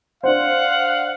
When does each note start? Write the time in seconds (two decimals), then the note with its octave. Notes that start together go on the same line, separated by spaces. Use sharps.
0.23 D4 C5 F5 F#5